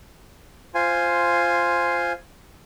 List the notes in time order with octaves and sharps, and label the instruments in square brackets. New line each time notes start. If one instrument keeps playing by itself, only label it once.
[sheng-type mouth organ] F4 C5 G#5